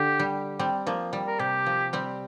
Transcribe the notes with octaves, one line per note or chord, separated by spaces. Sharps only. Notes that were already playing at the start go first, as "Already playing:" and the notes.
Already playing: D3 G4
G3
G3 C4
F3 A#3
G3
A#4
C3 G4
F3
G3 C4